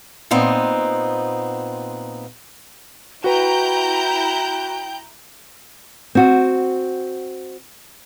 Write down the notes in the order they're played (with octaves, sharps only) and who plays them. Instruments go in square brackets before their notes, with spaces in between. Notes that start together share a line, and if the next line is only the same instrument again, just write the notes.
[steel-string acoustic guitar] A#2 B3 C4 D#4
[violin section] E4 A#5 G6 [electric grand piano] F#4 B4 [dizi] G5
[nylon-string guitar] C4 F#4